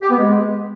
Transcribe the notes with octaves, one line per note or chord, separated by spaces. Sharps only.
G4
B3
G#3